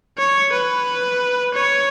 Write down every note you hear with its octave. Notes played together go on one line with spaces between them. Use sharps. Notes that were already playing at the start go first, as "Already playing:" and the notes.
C#5
B4
C#5